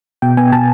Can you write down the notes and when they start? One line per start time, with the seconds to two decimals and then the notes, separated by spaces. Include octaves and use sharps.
0.22 B2 G5
0.37 B3 G#5
0.52 B2 A5